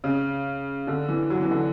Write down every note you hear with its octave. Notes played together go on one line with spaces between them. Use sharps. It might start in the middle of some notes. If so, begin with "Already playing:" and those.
C#3
D3
E3
F#3
E3
D3